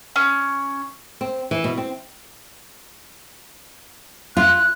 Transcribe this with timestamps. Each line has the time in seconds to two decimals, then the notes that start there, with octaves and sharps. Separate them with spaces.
0.16 C#4
1.21 C4
1.51 E3
1.64 B2
1.77 C4
4.37 F4 F#6